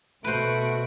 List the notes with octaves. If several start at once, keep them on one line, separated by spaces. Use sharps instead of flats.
C#2 B2 A3 F#4 B4 C5 D7